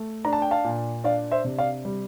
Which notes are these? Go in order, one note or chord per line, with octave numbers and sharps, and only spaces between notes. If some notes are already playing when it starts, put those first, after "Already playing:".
Already playing: A3
D4 A#5
A5
G5
F5 A5
A#2
D4 D5 F5
C5 E5
C3
D5 F5
G3